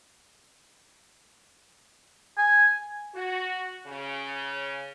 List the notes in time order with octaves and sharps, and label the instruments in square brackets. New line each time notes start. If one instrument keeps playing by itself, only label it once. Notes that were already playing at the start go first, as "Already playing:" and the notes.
[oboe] G#5
[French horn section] F#4
C#3